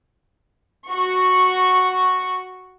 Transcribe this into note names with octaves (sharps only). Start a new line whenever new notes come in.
F#4 C#6